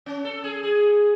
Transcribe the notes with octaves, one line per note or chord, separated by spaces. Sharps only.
C#4
A4
G#4
G#4